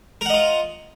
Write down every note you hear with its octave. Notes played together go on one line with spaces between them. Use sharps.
F4 A#4 D#5 F#5